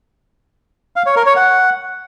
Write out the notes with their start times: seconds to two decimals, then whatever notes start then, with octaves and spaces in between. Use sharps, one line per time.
0.96 F5
1.06 C#5
1.16 A#4
1.26 C#5
1.36 F#5